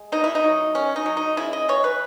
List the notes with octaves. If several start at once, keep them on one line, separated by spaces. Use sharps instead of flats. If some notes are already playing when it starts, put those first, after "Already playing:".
Already playing: G#3
B2 D#4
E4
D#4
F#3
D#3 C#4
D#4
F#3
D#4
C#3 E4
D#5
E3 C#5
B4